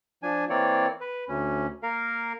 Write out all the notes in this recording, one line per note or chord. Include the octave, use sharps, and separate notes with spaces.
F3 D4 G#5
E3 A#3 C4 C#5 D5
B4
D2 C#4
A#3 A#4 F5